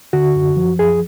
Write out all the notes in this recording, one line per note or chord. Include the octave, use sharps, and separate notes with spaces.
D3 F#4
F#2
F3
F#2 G#4